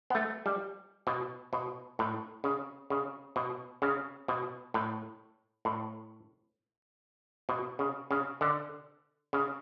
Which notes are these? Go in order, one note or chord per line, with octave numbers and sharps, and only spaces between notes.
B3
A3
G3
B2
B2
A2
C#3
C#3
B2
C#3
B2
A2
A2
B2
C#3
C#3
D3
C#3